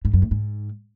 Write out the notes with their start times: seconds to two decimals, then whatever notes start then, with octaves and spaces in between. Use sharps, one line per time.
0.05 G#2
0.13 F#2
0.22 A2
0.31 G#2